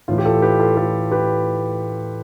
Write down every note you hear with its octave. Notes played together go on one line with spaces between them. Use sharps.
A2 E3 F4
G4
F4 A4
G4 B4
F4 A4
F4 A4
G4 B4